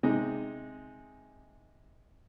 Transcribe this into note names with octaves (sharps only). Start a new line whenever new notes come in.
C3 G#3 D#4